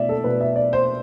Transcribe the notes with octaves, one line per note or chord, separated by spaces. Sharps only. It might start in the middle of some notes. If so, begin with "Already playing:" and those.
Already playing: B2 A3 D5 E5
A4
B2 A3 B4
E5
D5
C5